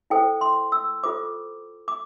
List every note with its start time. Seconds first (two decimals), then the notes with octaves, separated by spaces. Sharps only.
0.10 E4 A4 C5 G5
0.41 C6
0.72 E6
1.04 F4 A4 C5 D6
1.88 D6